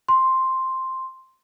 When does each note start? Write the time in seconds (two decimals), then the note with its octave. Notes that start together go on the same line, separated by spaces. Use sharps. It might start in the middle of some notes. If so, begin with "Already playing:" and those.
0.08 C6